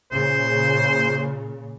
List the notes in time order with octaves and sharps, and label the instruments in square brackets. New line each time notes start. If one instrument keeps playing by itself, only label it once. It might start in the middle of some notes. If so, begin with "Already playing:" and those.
[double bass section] A#2 C#3 [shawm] C5